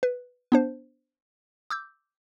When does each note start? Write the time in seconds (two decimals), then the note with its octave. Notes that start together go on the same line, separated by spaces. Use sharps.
0.03 B4
0.52 B3 D4 C5
1.70 D6 E6 G6